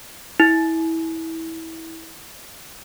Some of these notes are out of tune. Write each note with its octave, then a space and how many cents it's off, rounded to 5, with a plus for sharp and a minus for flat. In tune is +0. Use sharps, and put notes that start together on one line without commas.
E4 -20